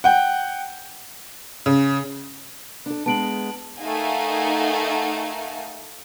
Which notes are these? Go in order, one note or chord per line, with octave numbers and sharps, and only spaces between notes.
F#5 G5
C#3
D4 A4
G#3 B3 A5 D7 F#7
A3 D#4 A#4 F5 F#5 G#5